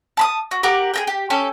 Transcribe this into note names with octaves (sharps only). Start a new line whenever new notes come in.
A5 B5 D#6
F#4
G4 A#4 F#5 D6
G#4 A#4 G5
G4
C#4 G4 A4